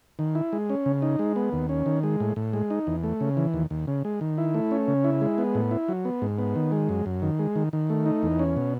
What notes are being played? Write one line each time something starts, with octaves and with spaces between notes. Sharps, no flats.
D#3
E4
G#3
C#4
C#3
D#4
G#3
B3
D#2
C#4
D#3
G#3
A2
A2
G#3
D#4
E2
A3
C#3
E3
D#2
D#2
C#3
G#3
D#3
E4
A3
C#4
C#3
E4
G#3
B3
A2
E4
F#3
B3
G#2
B3
D#3
G#3
F#2
F#2
D#3
G#3
D#3
D#3
A3
D#4
E2
C#4
B2